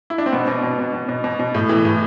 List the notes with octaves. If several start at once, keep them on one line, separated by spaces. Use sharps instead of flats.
E4
D4
C4
B2 B3
B2
B2
B2
B2
B2
B2
B2
A2
E3
A2